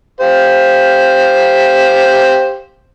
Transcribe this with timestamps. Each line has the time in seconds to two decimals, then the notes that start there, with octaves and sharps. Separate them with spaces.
0.20 G4 C5 F5